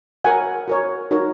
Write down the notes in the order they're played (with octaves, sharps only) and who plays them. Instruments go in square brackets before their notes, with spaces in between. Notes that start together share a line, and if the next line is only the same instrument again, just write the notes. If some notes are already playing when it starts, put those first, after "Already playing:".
[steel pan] F#4 A#4 C#5 F#5 G#5
F#4 A#4 C#5
D#4 F#4 A#4 C#5